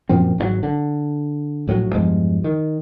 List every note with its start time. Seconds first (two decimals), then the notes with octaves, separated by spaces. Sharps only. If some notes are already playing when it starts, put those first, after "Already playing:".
0.09 F#2 A#2 F3 C4
0.38 G#1 D#3 F#3
0.63 D3
1.67 A#1 A2 D#3 F#3
1.95 E2 G2 F3 G#3
2.44 D#3